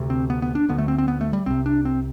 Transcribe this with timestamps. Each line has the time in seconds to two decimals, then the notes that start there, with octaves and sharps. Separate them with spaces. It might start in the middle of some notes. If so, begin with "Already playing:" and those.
Already playing: D2 C3
0.10 C4
0.30 B3
0.42 B3
0.55 D4
0.69 D2 D3 B3
0.78 A3
0.88 C4
0.98 C4
1.08 B3
1.21 A3
1.33 G3
1.46 C2 C3 C4
1.66 D4
1.85 C4